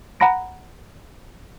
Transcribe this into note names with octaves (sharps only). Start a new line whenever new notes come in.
F#5 A#5 B5 A#6 D7